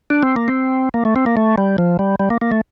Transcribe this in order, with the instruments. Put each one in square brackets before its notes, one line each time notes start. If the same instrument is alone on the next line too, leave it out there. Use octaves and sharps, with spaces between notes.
[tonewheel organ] D4
C4
A#3
C4
A#3
A3
C4
A#3
A3
G3
F3
G3
G3
A#3
A#3
A3